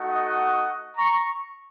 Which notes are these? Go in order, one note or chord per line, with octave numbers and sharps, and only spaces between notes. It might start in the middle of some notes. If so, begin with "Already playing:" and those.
Already playing: A3 D#4 F#4
D#5 F#5
A#5 C#6